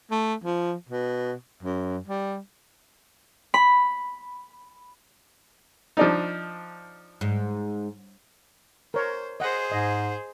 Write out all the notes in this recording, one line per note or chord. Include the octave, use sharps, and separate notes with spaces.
A3
F3
B2
F#2
G3
B5
F3 D4 D#4
G#2
A#4 C5 C#5
G#4 C5 D#5 F#5
G#2 D#5